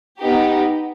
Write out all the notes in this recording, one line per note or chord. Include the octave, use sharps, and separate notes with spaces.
B3 D#4 G4